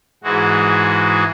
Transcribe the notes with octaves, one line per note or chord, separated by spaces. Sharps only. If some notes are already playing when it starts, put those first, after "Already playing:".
G#2 E3 G#3 F#4